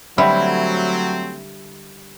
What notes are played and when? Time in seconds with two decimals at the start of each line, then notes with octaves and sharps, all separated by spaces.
0.18 D3 F#3 G3 A3 C4 E4